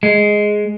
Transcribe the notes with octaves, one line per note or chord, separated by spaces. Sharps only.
G#3